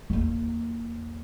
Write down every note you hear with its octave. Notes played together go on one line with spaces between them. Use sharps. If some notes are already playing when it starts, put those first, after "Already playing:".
E2 A#3